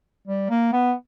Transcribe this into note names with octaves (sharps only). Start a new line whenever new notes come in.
G3
A#3
B3